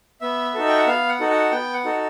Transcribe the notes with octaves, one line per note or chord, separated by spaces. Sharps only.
B3 E5
D#4 F#4 A4
G5
F#5
B3 F5
F#5
D#4 F#4 A4
F#5
B3 G5
F#5
D#4 F#4 A4